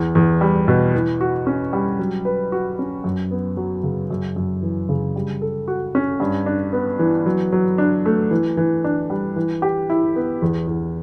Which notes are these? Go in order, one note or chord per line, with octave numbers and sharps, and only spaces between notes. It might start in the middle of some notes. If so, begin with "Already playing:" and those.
Already playing: E2
E2
G3
B2
E3
F#4
C#4
G3
F#3
B4
F#4
C#4
F#2
B3
F#3
C#3
F#2
F#2
E3
C#3
G3
A4
F#4
C#4
G2
D4
B3
E3
F#3
F#3
D4
A3
E3
E3
D4
G3
E3
G4
E4
B3
E2
E2